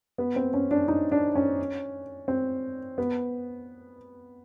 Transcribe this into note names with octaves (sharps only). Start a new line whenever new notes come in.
B3
C4
C#4
D4
D#4
D4
C#4
C4
B3